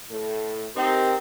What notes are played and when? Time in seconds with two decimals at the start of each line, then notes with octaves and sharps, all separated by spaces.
0.10 A2 A4
0.75 C4 D#4 G4 A#4